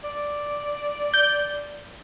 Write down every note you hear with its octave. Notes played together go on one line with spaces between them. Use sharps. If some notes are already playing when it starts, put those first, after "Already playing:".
D5
G6